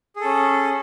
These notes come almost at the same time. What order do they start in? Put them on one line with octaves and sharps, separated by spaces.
G#4 A4 C#4